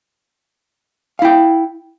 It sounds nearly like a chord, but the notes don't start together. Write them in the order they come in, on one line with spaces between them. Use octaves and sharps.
F5 E4 G5